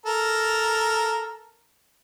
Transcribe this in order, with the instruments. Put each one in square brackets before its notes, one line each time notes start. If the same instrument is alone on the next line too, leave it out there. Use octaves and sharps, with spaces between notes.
[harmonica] A4 A#4 A#5